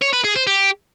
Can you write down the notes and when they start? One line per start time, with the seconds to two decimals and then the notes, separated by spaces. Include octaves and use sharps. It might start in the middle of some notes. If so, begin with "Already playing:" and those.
0.02 C#5
0.13 B4
0.24 G#4
0.36 C5
0.47 G4